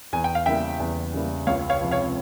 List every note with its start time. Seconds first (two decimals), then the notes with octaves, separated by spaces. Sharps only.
0.13 E2 G#5
0.24 G5
0.35 F5
0.46 C#3 G3 A#3 E4 E5 G5
0.80 E2
1.14 C#3 G3 A#3 E4
1.47 C#2 C#5 F5
1.70 C#5 F5
1.81 C3 F3
1.91 C#5 F5